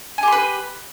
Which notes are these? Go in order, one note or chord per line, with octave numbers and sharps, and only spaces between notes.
G4 B4 G#5 C6